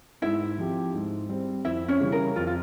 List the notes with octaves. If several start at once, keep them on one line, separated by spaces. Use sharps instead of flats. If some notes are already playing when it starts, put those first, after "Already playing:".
G#2 E4 E5
F3 C4 G4
G#2
G3 C4
F2 E4 E5
C#4 C#5
C#3 E3 G3
A#4
F2 F4
F4